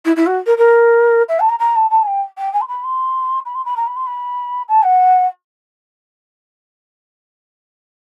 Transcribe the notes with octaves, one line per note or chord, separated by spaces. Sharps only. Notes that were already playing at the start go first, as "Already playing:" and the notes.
E4
E4
F#4
A#4
A#4
E5
A5
A#5
A#5
A5
A5
G#5
G5
G5
G#5
C6
B5
C6
B5
C6
B5
A#5
B5
C6
B5
A5
F#5